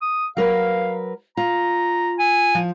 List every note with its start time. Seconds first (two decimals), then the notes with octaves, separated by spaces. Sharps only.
0.02 D#6
0.37 F#3 A#4 B4 F5
1.37 F4 A#5
2.19 G#5
2.55 F3